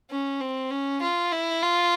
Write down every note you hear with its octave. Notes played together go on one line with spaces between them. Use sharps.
C#4
C4
C#4
F4
E4
F4